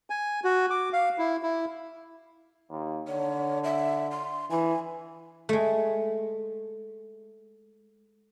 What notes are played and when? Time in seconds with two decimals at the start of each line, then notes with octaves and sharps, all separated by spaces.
0.10 G#5
0.44 F#4
0.70 D6
0.93 F5
1.18 E4
1.43 E4
2.70 D#2
3.08 D3 C#5
3.64 E5
4.11 C6
4.51 E3 G#5
5.49 G#3 A3